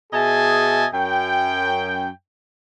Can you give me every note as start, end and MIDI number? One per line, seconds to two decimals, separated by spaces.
0.13 0.87 47
0.13 0.87 68
0.13 0.87 75
0.13 0.87 76
0.13 0.87 80
0.13 0.87 81
0.94 2.09 42
0.94 2.09 79